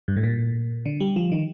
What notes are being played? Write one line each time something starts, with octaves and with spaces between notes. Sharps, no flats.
G2
A2
A#2
D3
G3
F3
D#3